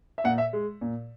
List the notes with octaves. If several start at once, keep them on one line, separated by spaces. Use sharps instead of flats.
E5
A#2 F#5
E5
G#3
A#2